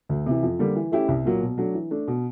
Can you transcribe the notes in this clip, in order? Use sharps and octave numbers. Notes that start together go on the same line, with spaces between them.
D2
C3 E3
F2
D3 G3 A#3
E3
A3 C#4 E4 G4
C2
A#2 F#3 A#3
B2
F#3 A3 D4
E3
A3 D4
B2